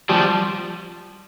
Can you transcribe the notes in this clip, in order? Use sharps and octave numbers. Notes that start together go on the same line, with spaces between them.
F3 G3